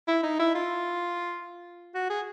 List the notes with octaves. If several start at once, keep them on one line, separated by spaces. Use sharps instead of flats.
E4
D#4
E4
F4
F#4
G#4